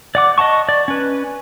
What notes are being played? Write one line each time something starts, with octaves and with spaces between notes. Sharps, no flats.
D5 F#5 D6
D#5 F#5 A5 C#6
D5
C#4 B4